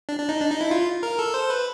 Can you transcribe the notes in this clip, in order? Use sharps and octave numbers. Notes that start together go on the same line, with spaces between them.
D4
D4
D#4
D4
D#4
E4
F4
A#4
A4
C5
B4